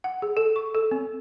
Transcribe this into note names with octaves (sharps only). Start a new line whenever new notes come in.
F#5
G#4
A4
C#6
A4
C4